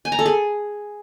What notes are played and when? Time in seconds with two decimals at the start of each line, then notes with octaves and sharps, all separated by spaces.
0.05 G#5
0.12 A#5
0.19 A4
0.26 G#4